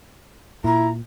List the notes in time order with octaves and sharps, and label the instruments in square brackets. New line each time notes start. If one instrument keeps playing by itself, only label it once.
[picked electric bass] A#2 [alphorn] E4 [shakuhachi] A#5